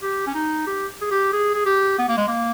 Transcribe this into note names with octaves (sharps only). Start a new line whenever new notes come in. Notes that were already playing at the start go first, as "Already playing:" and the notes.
G4
C#4
D#4
G4
G#4
G4
G#4
G#4
G4
B3
A#3
G#3
A#3